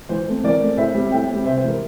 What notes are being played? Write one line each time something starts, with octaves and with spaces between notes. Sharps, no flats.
E3 C5
A3 C4
E3 A#4 D5
A3 C4
A2 C5 E5
G3 C4
A2 E5 G5
G3 C4
C3 C5 E5
C5
E3 G3 A#4